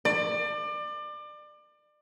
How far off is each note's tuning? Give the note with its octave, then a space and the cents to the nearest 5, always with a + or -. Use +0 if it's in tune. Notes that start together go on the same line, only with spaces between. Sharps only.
D5 +30